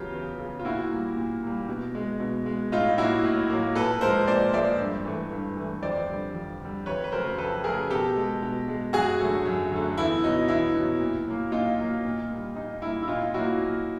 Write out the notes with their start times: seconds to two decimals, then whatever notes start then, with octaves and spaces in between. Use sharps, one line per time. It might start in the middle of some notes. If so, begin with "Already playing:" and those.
Already playing: E2 C#3 F#3 F4 G4
0.13 E2
0.39 C#3 F#3
0.59 F4
0.65 A#2 E4 F#4
0.91 G3 A#3
1.16 A#2
1.43 G3 A#3
1.69 B2
1.95 G#3
2.20 B2
2.46 G#3
2.72 A2 D#4 F4
2.97 F#3 A#3 E4 F#4
3.24 A2
3.50 F#3 A#3
3.75 A#2 A4 B4
4.01 F3 G#3 A#4 C5
4.27 A#2 C5 D5
4.53 F3 G#3 D5 E5
4.79 G2
5.05 E3 A3
5.32 G2
5.57 E3 A3
5.83 F2 C5 D5
6.09 D3 G3
6.35 F2
6.61 D3 G3
6.86 F2 B4 C#5
7.04 B4
7.12 C#3 F#3 A3 A#4 C5
7.38 F2 A4 B4
7.64 C#3 F#3 A3 G#4 A#4
7.90 B2 G4 A4
8.16 G#3
8.42 B2
8.68 G#3
8.93 F#2 F#4 G#4
9.20 D3 F#3 A3
9.46 F#2
9.72 D3 F#3 A3
9.98 E2 E4
10.24 B2 F#3 D#4
10.48 E2 E4
10.74 B2
10.80 F#3
11.00 A#2
11.27 F#3 A#3
11.52 A#2 D#4 F4
11.79 F#3 A#3
12.05 A#2
12.30 G3 A#3
12.56 A#2 D#4
12.82 G3 A#3 E4
13.03 E4
13.08 A#2 D#4 F4
13.34 F#3 A#3 E4 F#4
13.60 A#2